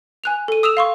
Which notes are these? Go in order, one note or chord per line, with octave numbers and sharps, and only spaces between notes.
G#5 F#6 F7
A4 D#7
D#6 E6 E7 F7
F5 C6 C#6